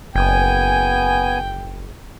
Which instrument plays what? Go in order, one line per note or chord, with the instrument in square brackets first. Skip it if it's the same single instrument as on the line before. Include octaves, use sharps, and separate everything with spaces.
[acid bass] F#1 [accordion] B3 G#5 [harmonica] G5